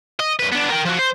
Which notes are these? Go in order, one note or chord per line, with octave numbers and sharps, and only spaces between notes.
D#5
F#2 B4
B3 D4
A#4 G5
F3 F#4
C5